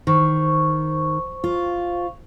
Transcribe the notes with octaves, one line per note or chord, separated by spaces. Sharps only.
D#3 C5 C#6
F4